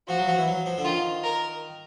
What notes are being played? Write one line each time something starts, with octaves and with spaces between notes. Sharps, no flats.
F3 F#4
F#3
F3
E3
F#3
F3
D3
D#3 F4
A#4